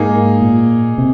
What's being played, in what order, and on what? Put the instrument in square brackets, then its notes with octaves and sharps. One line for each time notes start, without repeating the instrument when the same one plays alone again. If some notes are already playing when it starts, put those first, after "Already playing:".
Already playing: [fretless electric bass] G#2 [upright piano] A#3 D#4 G#4
[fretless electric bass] A#2
C3